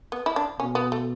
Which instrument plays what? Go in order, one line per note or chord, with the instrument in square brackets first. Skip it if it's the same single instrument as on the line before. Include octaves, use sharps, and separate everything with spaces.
[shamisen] B3
E4
D4
[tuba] B2 [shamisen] C#4
[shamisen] B3
A3